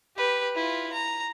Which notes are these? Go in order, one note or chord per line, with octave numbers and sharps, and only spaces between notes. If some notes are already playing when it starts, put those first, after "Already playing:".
G4 B4
E4 F4
A#5